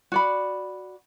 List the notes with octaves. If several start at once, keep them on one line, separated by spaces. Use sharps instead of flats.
F#4 D5 B5